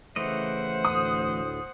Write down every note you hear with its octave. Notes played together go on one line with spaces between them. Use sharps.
C#3 E3 A3 C5 D#5 E5 F#5
D2 A2 D#6